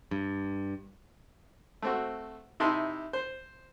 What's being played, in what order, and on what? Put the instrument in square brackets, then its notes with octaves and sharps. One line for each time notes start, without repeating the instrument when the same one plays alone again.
[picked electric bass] G2
[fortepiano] A3 C4 F#4
C3 D#4 E4 A5 C6
C5